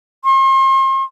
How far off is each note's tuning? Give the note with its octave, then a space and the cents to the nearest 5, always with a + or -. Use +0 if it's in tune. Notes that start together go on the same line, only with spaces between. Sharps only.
C6 +40